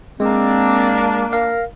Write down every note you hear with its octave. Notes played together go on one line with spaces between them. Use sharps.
G#3 A#3 C4 D4
A#4 F5